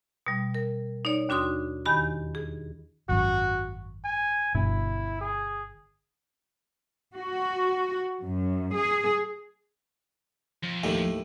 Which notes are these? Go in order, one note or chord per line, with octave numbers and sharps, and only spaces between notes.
B2 G3
A#4
D#4 C#5 D5
D#2 D4 F#4 C6 D#6
E2 D#3 G4 B5
G#4
G#1 F#2 F#4
G#5
G1 B2 D3 E4
G#4
F#4
F#2
G#4
F2
D#2 A2 D#3